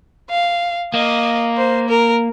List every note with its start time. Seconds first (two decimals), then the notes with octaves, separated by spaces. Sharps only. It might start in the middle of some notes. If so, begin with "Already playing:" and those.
0.30 F5
0.94 A#3 D#5
1.57 C5
1.89 A#4